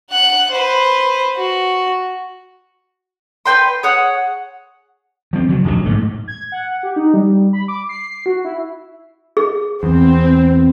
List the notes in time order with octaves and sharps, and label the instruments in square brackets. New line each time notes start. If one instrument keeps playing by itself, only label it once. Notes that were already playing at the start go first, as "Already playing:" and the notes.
[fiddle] F#5 F#6
B4 C5
F#4
[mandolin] B4 D5 G5 C6
G#4 C#5 F#5
[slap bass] F3 C4
C#3 F#3
D#1 A#1 G#2 F#3
G#2 A3
[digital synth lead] G#6
F#5
G4
D#4
G3
B5
D6
C7
F#4
E4
[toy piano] G#4
[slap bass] E2 [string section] C4